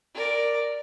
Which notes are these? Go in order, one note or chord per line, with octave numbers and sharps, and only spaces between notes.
A#4 D5